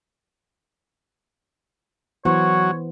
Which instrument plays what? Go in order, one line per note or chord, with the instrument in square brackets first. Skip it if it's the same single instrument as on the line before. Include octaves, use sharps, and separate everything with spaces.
[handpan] E3 B3 C5 [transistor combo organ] F#3 [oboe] C#5